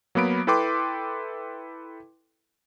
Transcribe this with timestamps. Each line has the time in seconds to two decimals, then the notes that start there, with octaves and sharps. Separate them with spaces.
0.15 F#3 A#3 B3 B5 D7
0.47 E4 A4 B4 G5 C6 D6